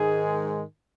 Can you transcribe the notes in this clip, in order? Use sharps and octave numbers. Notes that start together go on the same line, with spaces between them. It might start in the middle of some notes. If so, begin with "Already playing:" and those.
Already playing: G#2 D#3 G#3 G#4